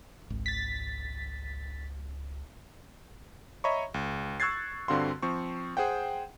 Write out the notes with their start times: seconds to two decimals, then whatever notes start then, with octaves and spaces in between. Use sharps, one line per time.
0.30 G#1 C#2
0.46 A6 B6
3.64 C#5 D#5 E5 A#5 B5 C#6
3.94 C#2
4.40 C#6 E6 F#6 G#6 A6 C7
4.88 G2 D3 C4 F#4 F5 C6
5.22 F3 C4 C#6
5.77 G#4 C5 F#5 G5